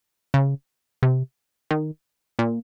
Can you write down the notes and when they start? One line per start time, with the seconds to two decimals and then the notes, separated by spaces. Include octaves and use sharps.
0.34 C#3
1.03 C3
1.71 D#3
2.39 A#2